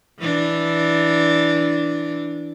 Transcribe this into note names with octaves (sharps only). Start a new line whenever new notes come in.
E3 D4